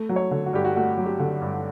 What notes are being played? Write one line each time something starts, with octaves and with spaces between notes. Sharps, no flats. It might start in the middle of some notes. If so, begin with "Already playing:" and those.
Already playing: A3
F#3
C#5
D3
F#4
G2 G4
F#4
A3 F#4
F#3
G4
D3
G2